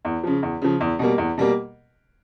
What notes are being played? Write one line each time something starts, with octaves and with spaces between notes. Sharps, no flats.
E2
C#3 F3
E2
C#3 F3
E2
B2 G3 A#3
E2
B2 G3 A#3